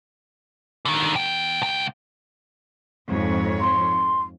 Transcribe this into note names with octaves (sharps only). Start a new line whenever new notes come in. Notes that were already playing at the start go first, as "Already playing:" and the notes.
D3 D#3
E2 G5
C#2 G5
F2 G#2 C#5
C6